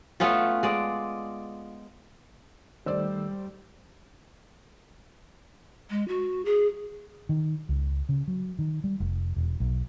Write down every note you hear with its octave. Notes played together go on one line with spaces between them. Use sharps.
A3 B3 C#4 F4
G#3 D5
D#3 G3 A3 C5 D5 E6
G#3
F#4
G#4
D#3
C#2
C#3
F#3
D#3
G3
F1
E1
B1